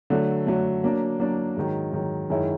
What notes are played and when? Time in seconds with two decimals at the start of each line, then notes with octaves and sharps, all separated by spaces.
0.10 D3 F#3 A3
0.47 D3 F#3 A3
0.83 F#3 A#3 D4
1.20 F#3 A#3 D4
1.57 G#2 D#3 F#3
1.92 G#2 D#3 F#3
2.30 F#2 D#3 G#3 C#4 E4